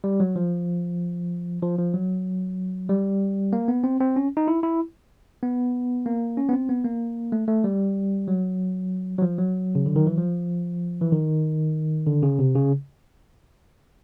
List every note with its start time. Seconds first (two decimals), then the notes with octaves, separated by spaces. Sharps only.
0.04 G3
0.20 F#3
0.36 F3
1.62 F3
1.79 F3
1.94 F#3
2.89 G3
3.53 A#3
3.68 B3
3.84 C4
4.00 C4
4.16 C#4
4.37 D#4
4.48 E4
4.63 E4
5.43 B3
6.06 A#3
6.37 C#4
6.49 B3
6.53 C4
6.69 B3
6.84 A#3
7.32 A3
7.48 A3
7.64 G3
8.28 F#3
9.18 F#3
9.22 F3
9.38 F#3
9.75 C#3
9.86 D3
9.96 D#3
10.07 E3
10.18 F3
11.02 E3
11.12 D#3
12.07 D3
12.23 C#3
12.39 C3
12.55 C#3